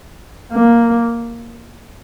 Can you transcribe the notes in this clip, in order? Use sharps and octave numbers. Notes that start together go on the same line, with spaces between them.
A#3